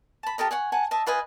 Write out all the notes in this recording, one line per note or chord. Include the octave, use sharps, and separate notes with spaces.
A5 B5
G4 A4 A#4 D#5
C#5 F#5 G#5
F#5 G#5 A5
D#5 E5 A5
F4 B4 D#5 G#5